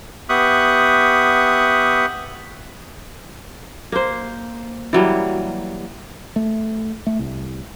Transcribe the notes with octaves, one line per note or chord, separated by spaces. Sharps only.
B3 G4 E5 C#6 D#6 F#6
A#3 C5
E3 F#3 G3 A#3
A3
A3
C2